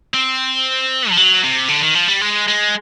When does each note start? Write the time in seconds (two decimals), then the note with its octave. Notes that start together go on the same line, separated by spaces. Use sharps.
0.14 C4
1.10 F3
1.17 F#3
1.44 C3
1.69 D3
1.82 D#3
1.95 F3
2.08 G3
2.21 G#3
2.48 G#3